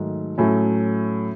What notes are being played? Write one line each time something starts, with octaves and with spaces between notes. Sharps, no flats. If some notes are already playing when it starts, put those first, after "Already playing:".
Already playing: G#2 D#3 F#3 A3
A2 F#3 A3 C#4